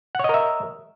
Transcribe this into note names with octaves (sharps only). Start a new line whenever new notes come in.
A#4 C#5 D#5 E5 F#5